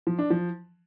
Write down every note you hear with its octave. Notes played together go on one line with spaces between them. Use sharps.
F3
D4
F3